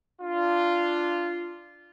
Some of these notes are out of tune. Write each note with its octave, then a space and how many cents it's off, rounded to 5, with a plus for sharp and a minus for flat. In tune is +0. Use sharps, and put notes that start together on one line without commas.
D4 +0 F4 -10